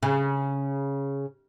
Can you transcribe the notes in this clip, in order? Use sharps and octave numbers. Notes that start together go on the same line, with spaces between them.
C#3